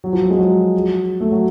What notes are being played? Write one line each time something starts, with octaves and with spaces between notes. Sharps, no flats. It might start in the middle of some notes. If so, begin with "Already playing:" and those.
F#3
F3
F#3
G#3
F#3
A3
F#3